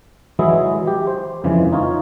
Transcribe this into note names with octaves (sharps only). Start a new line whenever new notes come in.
E3 F#3 G#3 E4 G#4
G4
C5
F2 C#3 E3 G#3
D#4 F4 C#5